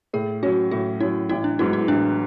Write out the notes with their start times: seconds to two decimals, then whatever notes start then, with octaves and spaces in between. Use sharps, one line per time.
0.13 A2 G#4
0.43 F#3 C#4 F#4
0.71 A2 F#4
1.00 F#3 C#4 E4
1.29 A1 E4
1.44 D4
1.59 G#2 F#3 B3 E4
1.73 E4
1.88 A1 D4